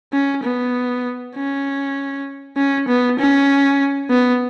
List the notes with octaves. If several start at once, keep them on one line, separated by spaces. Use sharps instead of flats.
C#4
B3
C#4
C#4
B3
C#4
B3